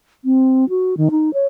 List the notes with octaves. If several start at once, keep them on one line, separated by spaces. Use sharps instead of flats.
C4
F#4
D#3
D#4
C#5